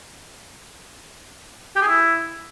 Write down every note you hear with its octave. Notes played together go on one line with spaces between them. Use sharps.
G4
G#4
E4